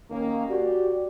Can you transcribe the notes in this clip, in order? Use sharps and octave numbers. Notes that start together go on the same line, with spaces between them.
D#3 A#3 C#4
F#4 G4 D5